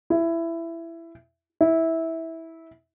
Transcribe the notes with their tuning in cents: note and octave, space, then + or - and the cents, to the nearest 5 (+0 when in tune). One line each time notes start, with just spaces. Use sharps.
E4 +15
E4 -15